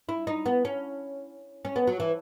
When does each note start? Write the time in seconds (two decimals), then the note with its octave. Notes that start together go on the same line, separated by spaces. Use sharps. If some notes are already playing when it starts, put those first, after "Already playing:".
0.09 E4
0.27 D#4
0.46 B3
0.65 C#4
1.65 C#4
1.76 B3
1.87 F#3
2.00 E3